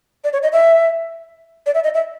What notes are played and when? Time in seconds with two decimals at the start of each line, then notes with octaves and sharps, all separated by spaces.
0.24 D5
0.33 C#5
0.43 D#5
0.53 E5
1.66 D5
1.75 E5
1.84 D#5
1.94 E5